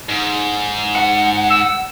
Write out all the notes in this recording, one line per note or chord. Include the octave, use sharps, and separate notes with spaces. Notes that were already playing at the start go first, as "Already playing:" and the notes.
G#2
F#5
E6